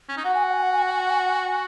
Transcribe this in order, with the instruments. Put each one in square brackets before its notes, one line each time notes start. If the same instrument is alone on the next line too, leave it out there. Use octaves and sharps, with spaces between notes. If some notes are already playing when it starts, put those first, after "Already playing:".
[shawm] C#4
D#4
[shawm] F#4 [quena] F#5
[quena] G#5
F#5
G#5
F#5
G#5
F#5
G#5
F#5
G#5
F#5
G#5
F#5
G#5